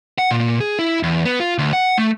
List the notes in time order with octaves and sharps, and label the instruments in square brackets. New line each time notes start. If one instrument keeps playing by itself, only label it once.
[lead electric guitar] F#5
A#2
G#4
E4
E2
B3
F4
D2
F#5
A3